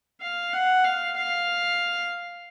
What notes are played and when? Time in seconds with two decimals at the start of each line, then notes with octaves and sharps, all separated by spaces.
0.21 F5
0.53 F#5
0.84 F5
1.16 F5